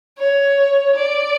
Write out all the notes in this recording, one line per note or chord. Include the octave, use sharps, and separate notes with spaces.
C#5
D5